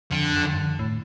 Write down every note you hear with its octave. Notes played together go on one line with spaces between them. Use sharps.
F2 D3
F2
G2
F2
A2